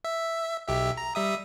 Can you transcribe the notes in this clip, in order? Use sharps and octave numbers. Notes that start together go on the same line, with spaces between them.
E5
B1 G4 E5
A#5
G3 E5 D#6